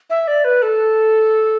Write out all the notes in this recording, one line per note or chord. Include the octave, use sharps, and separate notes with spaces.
E5
D5
B4
A4